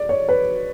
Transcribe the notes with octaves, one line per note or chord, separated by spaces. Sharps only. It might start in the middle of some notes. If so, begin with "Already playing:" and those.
Already playing: D5
C#5
B4